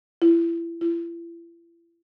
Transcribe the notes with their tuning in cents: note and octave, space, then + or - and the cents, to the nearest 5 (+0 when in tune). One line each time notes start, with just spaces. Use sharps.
E4 +30
E4 +40